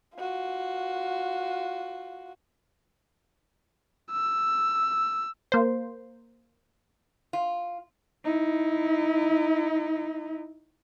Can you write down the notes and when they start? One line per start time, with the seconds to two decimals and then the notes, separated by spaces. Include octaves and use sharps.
0.16 F4 F#4
4.12 E6
5.52 A#3 C5
7.33 F4
8.24 D#4 E4